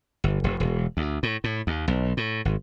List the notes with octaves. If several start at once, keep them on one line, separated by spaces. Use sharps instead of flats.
G1
F1
E1
D2
A2
A2
D#2
B1
A2
G#1